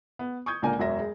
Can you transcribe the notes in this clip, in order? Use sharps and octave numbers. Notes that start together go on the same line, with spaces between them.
B3
C#6 D#6 G6 G#6
C#2 A#2 D3 A#3 A#4 G#5
E1 F#2 F#3 F#4 E5 A#6
G#3